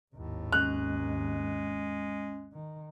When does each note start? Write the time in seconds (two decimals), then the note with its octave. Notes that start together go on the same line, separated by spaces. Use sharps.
0.14 G#1 D#2 A2
0.52 G#3 C#4 F#6
2.53 D#3